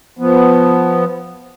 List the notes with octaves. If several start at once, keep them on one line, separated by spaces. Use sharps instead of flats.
F3 B3